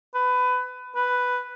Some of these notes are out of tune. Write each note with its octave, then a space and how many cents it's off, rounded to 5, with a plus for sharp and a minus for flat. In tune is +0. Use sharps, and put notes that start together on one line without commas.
B4 +20
B4 +5